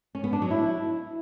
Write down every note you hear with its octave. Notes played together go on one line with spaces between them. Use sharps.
C#4
B3
D4
F#3
E4